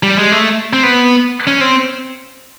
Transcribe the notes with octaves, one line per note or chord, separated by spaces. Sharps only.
G3
G#3
A3
C4
B3
C#4
C4